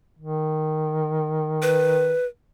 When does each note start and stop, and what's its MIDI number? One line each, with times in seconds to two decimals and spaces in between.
0.19 2.16 51
1.62 2.26 71